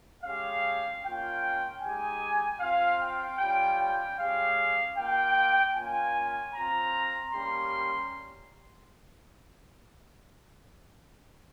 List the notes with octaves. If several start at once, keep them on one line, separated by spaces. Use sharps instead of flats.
G#3 C#4 G4 F5
A#3 C#4 F4 G5
G#3 D#4 G4 G#5
C4 F4 F5
G5
G3 C#4 F4 G5
G5
G#3 C#4 G4 F5
A#3 F4 G5
A#3 C#4 F4 G#5
C4 F4 A#5
G3 A#3 C#4 G4 C6